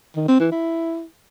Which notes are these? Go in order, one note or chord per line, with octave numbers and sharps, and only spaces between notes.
D#3
C4
E3
E4